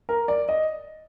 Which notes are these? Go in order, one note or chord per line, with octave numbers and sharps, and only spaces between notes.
A#4
D5
D#5